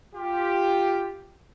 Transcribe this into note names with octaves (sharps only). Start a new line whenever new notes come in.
F4 G4